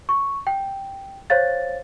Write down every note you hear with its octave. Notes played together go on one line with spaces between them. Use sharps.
C#6
G5
C5 C#5 F5 A6